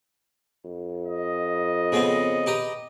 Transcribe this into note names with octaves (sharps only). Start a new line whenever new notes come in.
F2
D#5
C#3 B3 C4
G4 B4 A#5